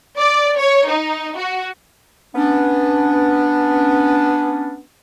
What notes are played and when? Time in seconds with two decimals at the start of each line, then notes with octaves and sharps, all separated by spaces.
0.18 D5
0.58 C#5
0.88 D#4
1.36 F#4
2.35 B3 C#4 D4